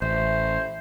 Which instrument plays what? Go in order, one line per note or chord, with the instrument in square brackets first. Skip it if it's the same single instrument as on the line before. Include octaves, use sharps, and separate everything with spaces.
[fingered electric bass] A1 [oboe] C5 [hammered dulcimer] E5